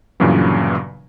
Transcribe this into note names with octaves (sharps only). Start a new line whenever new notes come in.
G1 G2 A#2 C#3 E3 F#3